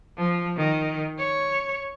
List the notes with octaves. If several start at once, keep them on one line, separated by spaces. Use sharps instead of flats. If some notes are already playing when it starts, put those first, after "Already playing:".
F3
D#3
C#5